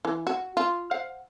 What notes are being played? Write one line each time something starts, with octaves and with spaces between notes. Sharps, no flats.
E3
F#4
F4
C5 F5 F#5